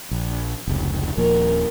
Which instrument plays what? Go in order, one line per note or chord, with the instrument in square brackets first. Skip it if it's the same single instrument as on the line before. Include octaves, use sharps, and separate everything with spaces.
[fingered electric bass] A#1
F1 C#2
[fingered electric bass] D#1 A#2 F3 [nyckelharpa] A#4